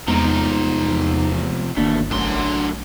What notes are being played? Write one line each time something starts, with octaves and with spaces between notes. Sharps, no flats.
E2 C3 F3 G#3 B3 D#4 A#5
G1 B2 D#3 A3 A#3 D4
A#1 F#2 D3 F#3 A3 D4 C6